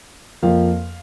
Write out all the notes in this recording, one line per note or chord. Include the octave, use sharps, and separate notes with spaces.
F2 F3 A#3 F5